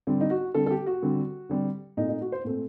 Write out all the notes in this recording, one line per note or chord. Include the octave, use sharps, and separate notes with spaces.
D3 G3 C4
D#4
F#4
D3 G3 C4 A4
A4
G4
F#4
D3 G3 C4
D3 G3 C4
A#2 A3 C4 D#4
D#4
F#4
C5
A#2 A3 C4